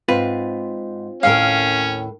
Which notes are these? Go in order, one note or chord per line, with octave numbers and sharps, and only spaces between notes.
G#2 C4 F4 B4
D#2 A2 C#4 A#4 C#5 F5